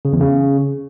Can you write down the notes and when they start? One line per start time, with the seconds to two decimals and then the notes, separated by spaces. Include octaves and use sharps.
0.05 C#3
0.13 E2
0.21 C#3